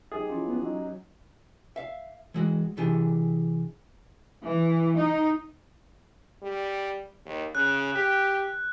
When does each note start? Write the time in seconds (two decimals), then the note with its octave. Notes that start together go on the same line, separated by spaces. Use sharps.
0.12 F#3 D#4 G4 G#4
0.30 F3 C#4 E4 F4
0.47 B3
0.62 F#3 D#4
1.76 E5 F5
2.34 E3 G#3 F#4
2.77 C3 E3 D4 G4 G#4
4.42 E3
4.96 D#4
6.42 G3
7.25 D#2
7.55 C#3 F#6
7.95 G4